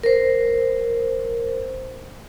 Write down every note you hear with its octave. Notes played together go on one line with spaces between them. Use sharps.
A#4 C5